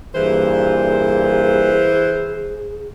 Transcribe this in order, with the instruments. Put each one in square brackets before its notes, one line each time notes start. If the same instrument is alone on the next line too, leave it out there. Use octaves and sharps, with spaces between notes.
[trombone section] G2 A#2 A#3 [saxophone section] E3 C5 [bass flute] G#4